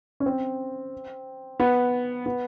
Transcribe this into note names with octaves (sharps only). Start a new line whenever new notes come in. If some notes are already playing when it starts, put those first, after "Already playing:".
C#4
C4
B3
B3